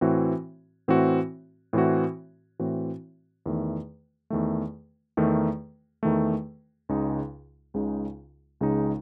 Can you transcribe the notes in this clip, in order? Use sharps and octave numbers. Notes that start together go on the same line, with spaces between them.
A2 E3 C4 F#4
A2 E3 C4 F#4
A2 E3 C4 F#4
A2 E3 C4 F#4
E2 D#3 A3
E2 D#3 A3
E2 D#3 A3
E2 D#3 A3
C#2 C#3 G#3 D#4
C#2 C#3 G#3 D#4
C#2 C#3 G#3 D#4